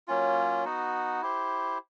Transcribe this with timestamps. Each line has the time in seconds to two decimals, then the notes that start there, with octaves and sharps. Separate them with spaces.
0.08 F#3 A#3 C#4 F4
0.65 B3 D#4 F#4
1.22 E4 G4 C5